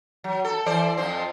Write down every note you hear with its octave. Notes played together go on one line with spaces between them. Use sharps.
F#3
A4
E3 C5 D5
F2 F3 C5